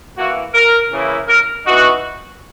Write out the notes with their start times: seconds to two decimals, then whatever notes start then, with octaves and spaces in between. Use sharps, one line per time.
0.17 E3 A#3 E4 F#4
0.54 A#4
0.91 C#3 E3 A#3 E4
1.28 A#4
1.66 E3 B3 D#4 F#4